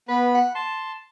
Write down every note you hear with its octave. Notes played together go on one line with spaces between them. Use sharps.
B3 B4 B5
F#5
A5 C6